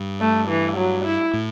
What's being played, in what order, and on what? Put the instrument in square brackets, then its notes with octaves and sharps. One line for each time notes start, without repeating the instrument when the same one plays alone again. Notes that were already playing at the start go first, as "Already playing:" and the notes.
Already playing: [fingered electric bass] G2
[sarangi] A3
E3
F#3
E4
[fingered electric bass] A2